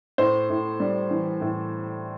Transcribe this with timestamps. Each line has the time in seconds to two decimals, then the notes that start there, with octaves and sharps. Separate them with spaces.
0.18 A2 C5
0.50 A2
0.80 G3
1.11 E3
1.41 A2